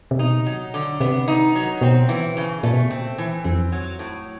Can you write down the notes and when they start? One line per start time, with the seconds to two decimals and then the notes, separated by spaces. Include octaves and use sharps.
0.11 C3
0.19 B2 D#4
0.47 F#3
0.74 D3
1.00 C3 B3
1.28 D#4
1.55 F#3
1.81 B2 C4
2.09 E3
2.37 C#3
2.63 A#2 A3
2.74 B2
2.83 A#2
2.91 C4
3.18 E3
3.44 F2 C4
3.72 F#3
3.99 A2